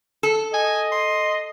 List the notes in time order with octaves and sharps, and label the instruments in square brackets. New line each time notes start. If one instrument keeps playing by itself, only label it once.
[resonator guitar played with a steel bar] A4
[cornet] D#5 [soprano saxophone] G#5
[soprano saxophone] C6